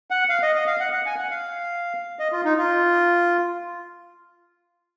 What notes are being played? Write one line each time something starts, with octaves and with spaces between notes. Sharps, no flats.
F#5
F5
D#5
D#5
F5
F#5
F#5
G#5
F#5
F5
D#5
F4
D#4
F4